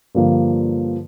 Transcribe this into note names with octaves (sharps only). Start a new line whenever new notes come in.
G2 D3 F3 A#3